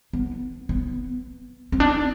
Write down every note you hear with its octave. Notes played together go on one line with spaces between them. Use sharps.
B3
B3
C4
D4